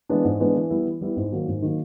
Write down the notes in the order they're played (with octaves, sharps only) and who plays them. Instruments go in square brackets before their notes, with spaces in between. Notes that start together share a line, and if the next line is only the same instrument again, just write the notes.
[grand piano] E3 G#3 B3 D4
G#2
E3 G#3 B3 D4
E3
G3 B3 E4
E3
G3 B3 E4
G#2
D#3 F#3 A#3
G#2
D#3 F#3 A#3